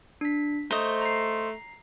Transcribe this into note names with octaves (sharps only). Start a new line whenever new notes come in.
D4 B6
A3 C5 D#5 A#5 C#6
A#5 C7